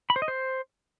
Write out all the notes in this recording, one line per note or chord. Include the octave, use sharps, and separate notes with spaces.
B5
C5
D#5
C5